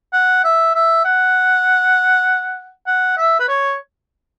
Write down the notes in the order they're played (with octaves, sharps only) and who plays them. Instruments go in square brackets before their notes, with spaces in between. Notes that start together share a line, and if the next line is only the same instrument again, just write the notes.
[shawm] F#5
E5
E5
F#5
F#5
E5
B4
C#5